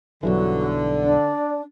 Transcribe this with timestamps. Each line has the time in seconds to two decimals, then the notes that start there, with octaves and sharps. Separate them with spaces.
0.23 B1 G2 D3 E3 F#3
1.05 D4 D5